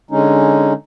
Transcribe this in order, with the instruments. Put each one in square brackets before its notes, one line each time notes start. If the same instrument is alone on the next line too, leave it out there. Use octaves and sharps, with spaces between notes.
[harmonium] D3 G#3 C#4 D#4